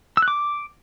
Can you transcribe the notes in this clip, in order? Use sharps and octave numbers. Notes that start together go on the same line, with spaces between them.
E6
F#6
D6